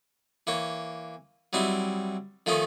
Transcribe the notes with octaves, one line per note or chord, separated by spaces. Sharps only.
E3 A#3 C#5
F#3 G3 C4 D#4 E4
D#3 F3 A3 C#4 D#4